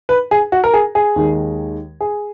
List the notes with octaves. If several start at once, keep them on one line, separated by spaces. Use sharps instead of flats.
B4
G#4
F#4
A#4
G#4
G#4
D#2 D#3 G#3
G#4